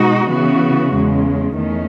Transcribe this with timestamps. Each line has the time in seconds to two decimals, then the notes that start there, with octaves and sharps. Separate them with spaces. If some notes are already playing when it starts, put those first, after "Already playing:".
Already playing: B2 G#3 D#4 F#4
0.28 C#3 E3 B3 F#4
0.93 E2 C#3 G#3
1.56 E2 D#3 A3 C#4